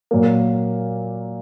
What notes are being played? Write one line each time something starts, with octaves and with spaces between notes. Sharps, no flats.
A#2 F#3 A#3